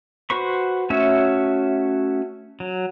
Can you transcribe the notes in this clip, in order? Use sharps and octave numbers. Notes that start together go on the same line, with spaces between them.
F#4 B4 C5 B5 C#6
A3 C#4 F#4 C#5 E5
F#3